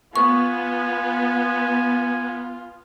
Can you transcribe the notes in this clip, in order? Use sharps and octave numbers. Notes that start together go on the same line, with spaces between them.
B3 F4 G#5 C#6